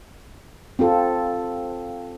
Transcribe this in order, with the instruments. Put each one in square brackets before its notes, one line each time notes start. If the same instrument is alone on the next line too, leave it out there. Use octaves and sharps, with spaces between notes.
[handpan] C4 F4 A4